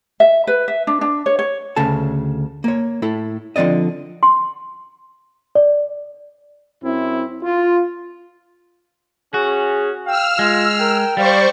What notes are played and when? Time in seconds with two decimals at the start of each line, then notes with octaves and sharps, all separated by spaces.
0.20 E5
0.47 B4
0.68 E5
0.87 D4
1.01 D4
1.26 C#5
1.39 C#5
1.76 D2 C#3 A4 A5
2.64 A#3 C#5
3.02 A2 E4 A4
3.56 D3 F3 C4 D5 D#5
4.23 C6
5.55 D5
6.83 F#2 C4 E4
7.43 F4
9.34 C#4 F#4 G#4
10.07 F5 G5 E6 F6
10.39 G#3 F4
10.80 A#4 G5
11.17 G3 C5 D5 F5 C#6